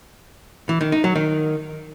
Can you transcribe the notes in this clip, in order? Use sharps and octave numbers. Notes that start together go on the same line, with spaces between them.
E3
D#3
D#4
F#3
D#3